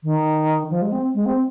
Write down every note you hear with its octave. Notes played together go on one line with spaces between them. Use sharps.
D#3
F3
G#3
C4
G#3
C4